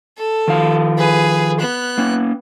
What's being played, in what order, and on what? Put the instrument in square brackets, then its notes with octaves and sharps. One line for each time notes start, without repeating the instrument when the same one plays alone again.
[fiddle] A4
[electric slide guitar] D#3 F3 F5
[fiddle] G#4 B4
B3 F#6
[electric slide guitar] A#3 C#4